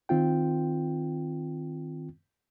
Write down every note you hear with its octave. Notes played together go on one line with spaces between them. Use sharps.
D#3 C4 F4 G5